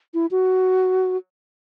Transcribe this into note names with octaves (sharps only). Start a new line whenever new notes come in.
E4
F#4